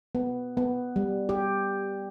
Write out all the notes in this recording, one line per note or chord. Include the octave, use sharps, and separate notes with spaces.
B3
B3
G3
G4